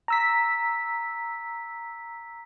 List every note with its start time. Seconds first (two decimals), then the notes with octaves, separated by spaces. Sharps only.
0.08 A#5 E6 B6